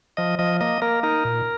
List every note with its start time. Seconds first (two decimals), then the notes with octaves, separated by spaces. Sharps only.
0.17 F3 D#5
0.39 F3 D#5
0.61 A#3 D#5
0.82 A#3 A#4
1.03 D#4 A#4
1.25 A#2